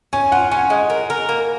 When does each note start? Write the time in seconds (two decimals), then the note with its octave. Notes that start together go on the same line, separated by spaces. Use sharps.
0.13 C#4 G#5
0.32 F4 F#5
0.51 C#4 G#5
0.70 G#3
0.90 A#4
1.10 A#4
1.29 A#3